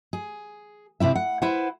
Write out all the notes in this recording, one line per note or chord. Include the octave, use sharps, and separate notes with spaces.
G#4
C3 C4 E4 E5
F#5
E4 B4 C5 F#5